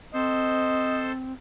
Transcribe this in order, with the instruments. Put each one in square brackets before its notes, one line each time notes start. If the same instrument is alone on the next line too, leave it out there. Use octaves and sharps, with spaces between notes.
[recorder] C4 [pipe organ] A4 C5 [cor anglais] D#5